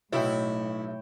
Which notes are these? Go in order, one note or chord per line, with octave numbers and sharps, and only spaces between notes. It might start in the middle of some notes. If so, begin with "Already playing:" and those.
B1 A2 E4 C#5 G5